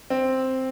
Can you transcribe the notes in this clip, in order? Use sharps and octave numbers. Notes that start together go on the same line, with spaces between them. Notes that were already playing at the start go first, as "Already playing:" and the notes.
C4